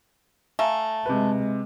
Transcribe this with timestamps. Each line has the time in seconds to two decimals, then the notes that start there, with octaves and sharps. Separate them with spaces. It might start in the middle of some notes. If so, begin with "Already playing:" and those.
0.59 A3 F5 G#5 A#5
1.06 C3 G#3 B4